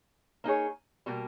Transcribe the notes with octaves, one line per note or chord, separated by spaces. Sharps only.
A#3 D#4 G#4 C#5
B2 G3 A#3